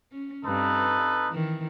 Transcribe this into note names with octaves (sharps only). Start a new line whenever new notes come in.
C#4
G2 C4 D#4 A4 B4
D#3 E3